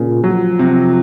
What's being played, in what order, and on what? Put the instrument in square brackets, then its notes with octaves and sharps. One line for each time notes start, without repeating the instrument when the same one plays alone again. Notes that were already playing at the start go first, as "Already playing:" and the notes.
Already playing: [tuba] A#2 [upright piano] C#3
[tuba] F3 [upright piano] F#3
[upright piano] C3